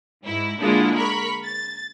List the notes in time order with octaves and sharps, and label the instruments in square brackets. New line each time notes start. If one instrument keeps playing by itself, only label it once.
[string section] G#2 E4
D3 G#3 A#3 D4 E4 F4
A#4 B5 C#6
A6